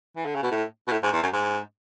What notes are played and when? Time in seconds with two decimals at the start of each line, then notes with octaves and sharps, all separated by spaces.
0.17 E3
0.25 D3
0.35 C#3
0.43 B2
0.51 A2
0.88 B2
0.92 A2
1.03 G#2
1.13 E2
1.23 F#2
1.33 G#2